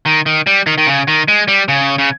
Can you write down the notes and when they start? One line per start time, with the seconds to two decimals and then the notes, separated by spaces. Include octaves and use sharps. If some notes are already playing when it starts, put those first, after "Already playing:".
0.06 D#3
0.26 D#3
0.47 G3
0.67 D#3
0.78 D#3
0.87 C#3
1.08 D#3
1.28 G#3
1.48 G3
1.68 C#3
1.98 C#3